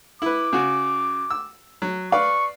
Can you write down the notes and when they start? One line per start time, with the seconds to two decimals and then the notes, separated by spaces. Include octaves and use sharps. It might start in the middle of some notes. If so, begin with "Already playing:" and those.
0.22 E4 B4 D6
0.53 C#3 F#4
1.31 E6
1.82 F#3
2.12 B4 D5 F5 C#6